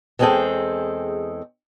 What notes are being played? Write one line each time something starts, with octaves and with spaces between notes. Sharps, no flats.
E2 G#3 C4 G#4 A4 G5